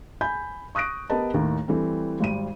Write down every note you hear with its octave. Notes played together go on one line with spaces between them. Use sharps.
G#5 B5 G6
C#6 D#6 F#6 A#6 D7
B3 G4 A#4 B4 D#5 A5
D#2 A2 D#3
E3 G3 A3 C4
G#1 G3 D#7